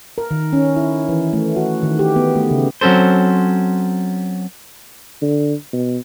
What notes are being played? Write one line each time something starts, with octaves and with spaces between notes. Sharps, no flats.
A#4
D#3
C#4
E4
E3
A3
F#4
D#3
G4
B3
A3
C#3
F#3 C4 C#4 A4 C5
D3
B2